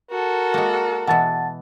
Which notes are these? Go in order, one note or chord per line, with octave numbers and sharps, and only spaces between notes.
F#4 A4 A#4
G#3 A#3
B2 E3 F#5 A5 A6